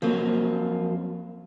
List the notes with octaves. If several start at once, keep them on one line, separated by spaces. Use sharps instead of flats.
F2 F3 F#3 A#3